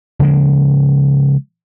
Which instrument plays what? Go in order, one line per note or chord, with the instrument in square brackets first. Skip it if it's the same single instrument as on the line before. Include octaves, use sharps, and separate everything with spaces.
[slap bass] C#3 F3 G#3 A#3